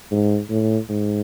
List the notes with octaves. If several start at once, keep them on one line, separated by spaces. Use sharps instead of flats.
G#2
A2
G#2